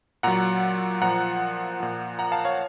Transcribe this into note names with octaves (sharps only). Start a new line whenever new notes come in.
A#2 F#3 F#5 A#5
A#2 F3 F#5 A#5
A#2 F3
F#5 A#5
F5 A5
C#5 F5